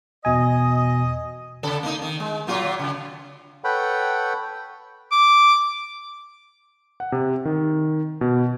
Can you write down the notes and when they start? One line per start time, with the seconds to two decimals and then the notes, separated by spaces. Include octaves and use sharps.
0.25 E2 B2 D#5 G#5
1.63 C#3 A4
1.83 A#3 D#4
2.02 D#3
2.20 G#3
2.47 A#2 F#3 F4
2.79 C#3
3.64 A4 B4 C#5 F#5 G5 B5
5.12 D6
7.00 F#5
7.12 C3
7.45 D#3
8.21 B2